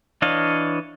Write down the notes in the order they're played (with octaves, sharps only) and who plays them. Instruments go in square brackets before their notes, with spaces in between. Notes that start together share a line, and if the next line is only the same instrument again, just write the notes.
[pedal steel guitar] E3 D4 C#5 D#5 F5